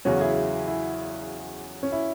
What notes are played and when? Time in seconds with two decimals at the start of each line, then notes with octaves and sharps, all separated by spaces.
0.05 E2 C#3 F#3 C#4 F#4
0.21 E4 G#4
0.67 E4
1.83 C#4
1.92 E4